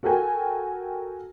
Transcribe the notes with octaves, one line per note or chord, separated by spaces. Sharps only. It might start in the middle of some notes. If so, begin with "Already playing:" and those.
F#4 A4 A#4 G5 G#5